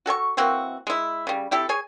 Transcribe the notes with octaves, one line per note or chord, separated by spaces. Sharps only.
F#4 A4 G#5 C#6
E3 A#3 C4 F#4
G#3 E4
C#3 G3
C4 E4 G4 A4
G#4 C#5 G#5